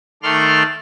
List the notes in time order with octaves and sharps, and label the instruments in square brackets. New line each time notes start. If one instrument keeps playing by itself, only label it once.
[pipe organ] D#3 A3 A4 D5 C6 F6